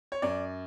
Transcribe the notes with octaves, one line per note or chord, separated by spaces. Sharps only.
C#5
F#2 D5